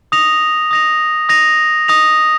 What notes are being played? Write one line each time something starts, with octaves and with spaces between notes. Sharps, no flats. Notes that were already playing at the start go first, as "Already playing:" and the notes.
D#6 A#6 F7
D#6 A#6 F7
D#6 A#6 F7
D#6 A#6 F7